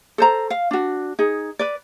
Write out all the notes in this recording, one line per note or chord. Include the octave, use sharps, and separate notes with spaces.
A4 C5 A#5
F5
D4 F#4
D#4 G#4
B4 D5